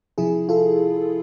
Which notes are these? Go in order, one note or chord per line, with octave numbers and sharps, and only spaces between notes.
C3 F3 E4 G#4
F4 A4